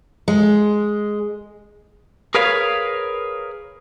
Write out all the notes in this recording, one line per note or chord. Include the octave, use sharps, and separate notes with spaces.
G#3
G#4 A#4 B4 C#5 F5